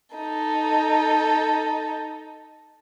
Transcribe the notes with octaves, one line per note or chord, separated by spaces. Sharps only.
D#4 A4